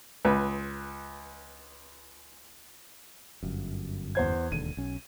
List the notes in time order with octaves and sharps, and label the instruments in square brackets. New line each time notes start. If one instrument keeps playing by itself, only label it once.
[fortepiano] C#2 B4
[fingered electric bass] G1 F#2
[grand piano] E2 C5 G#6
[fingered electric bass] E1 D#2 D3 [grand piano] D#7
[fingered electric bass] B1 C#4